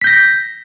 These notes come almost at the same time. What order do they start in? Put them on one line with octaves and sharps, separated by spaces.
B6 G6 A#6